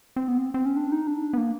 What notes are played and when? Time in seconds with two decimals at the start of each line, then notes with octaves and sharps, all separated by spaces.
0.16 C4
0.28 B3
0.38 C4
0.54 C4
0.66 C#4
0.76 D4
0.92 D#4
1.07 D4
1.33 B3
1.38 A#3